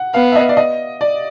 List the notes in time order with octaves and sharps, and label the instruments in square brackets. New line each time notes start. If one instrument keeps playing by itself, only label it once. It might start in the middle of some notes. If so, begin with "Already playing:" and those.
Already playing: [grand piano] F#5
[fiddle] B3 [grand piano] F5
[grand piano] E5
D#5
D5
D#5
D5